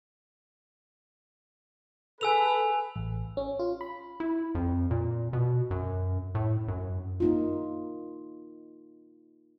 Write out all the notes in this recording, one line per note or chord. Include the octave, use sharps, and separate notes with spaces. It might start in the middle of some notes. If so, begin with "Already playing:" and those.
G#4 A4 B4 G#5 E6 F7
A1
C#4
F4
B5
E4
F2
A#2
B2
F#2
A2
F#2
A#3 D#4 F4